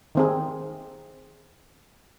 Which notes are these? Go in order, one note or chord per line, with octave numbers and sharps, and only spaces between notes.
D#3 C4 G#4